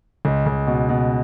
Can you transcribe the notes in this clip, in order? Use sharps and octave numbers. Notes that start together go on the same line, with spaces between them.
C#2
C#2
B2
B2